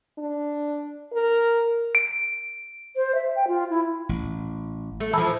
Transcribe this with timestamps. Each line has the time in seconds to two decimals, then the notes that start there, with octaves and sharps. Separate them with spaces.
0.19 D4
1.13 A#4
1.95 D7
2.96 C5
3.15 E5
3.36 G5
3.47 F4
3.70 E4
4.09 A1
5.00 A3
5.13 E3 F3 A5 B5 E6